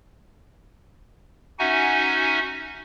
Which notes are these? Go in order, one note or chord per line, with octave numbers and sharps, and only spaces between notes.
C#4 D#4 F#4 E5 F#5 G#5